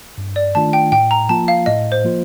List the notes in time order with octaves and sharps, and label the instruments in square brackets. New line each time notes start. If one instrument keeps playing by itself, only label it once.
[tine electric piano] G2
[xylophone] D5
[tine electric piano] D#3 A3 D4 F4 [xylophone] A5
[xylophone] G5
[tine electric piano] A2 [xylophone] G5
[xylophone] A#5
[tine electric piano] F3 A#3 F4 [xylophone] A5
[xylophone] F5
[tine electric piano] A2 [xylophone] D#5
[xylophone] C5
[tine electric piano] F3 A#3 F4